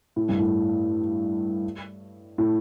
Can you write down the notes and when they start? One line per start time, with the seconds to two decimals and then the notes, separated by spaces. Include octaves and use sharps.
0.16 A2
0.29 G2
0.39 A2
2.38 A2